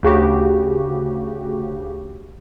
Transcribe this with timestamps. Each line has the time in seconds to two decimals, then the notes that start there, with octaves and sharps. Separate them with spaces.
0.03 D2 C#3 F#4 G4